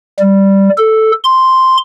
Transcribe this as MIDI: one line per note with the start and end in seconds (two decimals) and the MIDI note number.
0.19 0.69 55
0.78 1.11 69
1.24 1.78 84